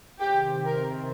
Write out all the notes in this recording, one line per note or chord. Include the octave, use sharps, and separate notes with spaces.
C3 D#3 C4 G4
A#4